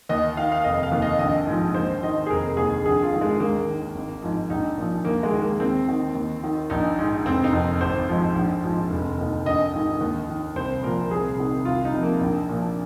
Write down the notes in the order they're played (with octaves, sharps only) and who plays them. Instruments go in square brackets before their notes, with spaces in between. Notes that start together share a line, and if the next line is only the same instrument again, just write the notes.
[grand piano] D#2 D#5
D#3 F5
F5
F1 D#5
F5
D#2 D#3
D#5
A#1 D#5
G#2 F3
D#2 C5
D#3 D#5
G#4
F1 A#4
D#2 D#3 G#4
A#1 G#4
F4
G#2 D#3
G#3
D#2 A#3
D#3
G#1
G#2 F3
A#1 D#4
A#2 F3
D#2 A#3
G#3
D#3
A#3
D#2 C4
D#3
D#2
D#3
A#1 D#4
G#2 D#3
F1 C4
D#4
F2 D#3
G#1 C5
G#2 F3
A#1
G#2 F3
F1
D#2 D#3
A#1 D#5
G#2 D#3
D#2
D#3
C2 C5
A#2 F3 A#4
C2 G#4
C3 D#3
C2 F4
D#4
C3 F3
A#3
A#1
A#2 F3